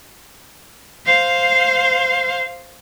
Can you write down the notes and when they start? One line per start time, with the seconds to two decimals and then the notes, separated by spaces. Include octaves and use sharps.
1.06 C5 F5